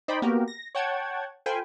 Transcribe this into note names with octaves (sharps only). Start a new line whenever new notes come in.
D#4 C5 D5 G5 B5
A#3 B3 F#4 G4 A#4
A#6
C#5 F#5 G5 A5 G#6
F4 A4 C5 G5 G#5 B5